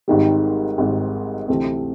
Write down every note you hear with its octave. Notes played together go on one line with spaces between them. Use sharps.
G#1 G#2 D#3 G3
G#1 G#2 D#3 G3
D2 C3 E3 A3 C4